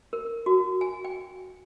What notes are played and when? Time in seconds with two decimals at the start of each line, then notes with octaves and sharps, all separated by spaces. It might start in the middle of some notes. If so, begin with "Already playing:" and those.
0.13 A#4
0.46 F#4
0.81 G#5
1.04 G5